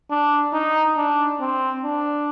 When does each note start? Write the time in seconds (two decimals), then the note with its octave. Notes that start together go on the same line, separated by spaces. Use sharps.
0.10 D4
0.53 D#4
0.97 D4
1.40 C4
1.84 D4